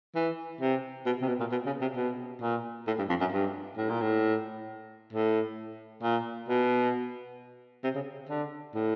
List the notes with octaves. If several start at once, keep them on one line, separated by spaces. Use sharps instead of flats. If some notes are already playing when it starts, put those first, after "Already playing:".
E3
C3
B2
C3
B2
A#2
B2
C#3
C3
B2
A#2
A2
G2
F2
F#2
G2
A2
A#2
A2
A2
A#2
B2
C3
C#3
D3
A2